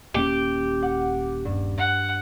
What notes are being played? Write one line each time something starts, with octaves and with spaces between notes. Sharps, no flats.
D#1 A#3 C#4 G4
F#5 D6
G2
F#5